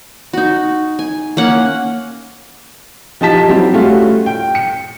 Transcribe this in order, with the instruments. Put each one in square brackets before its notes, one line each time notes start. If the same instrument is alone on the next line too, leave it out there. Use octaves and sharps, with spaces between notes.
[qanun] D#4 F#4
G#5
A#3 C#4 F#5
[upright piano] F3 D#4 G4 A5 B6
F#3 G3 C4 E4 G4
G3 A3 C#4 F4 F#4
G5
C#7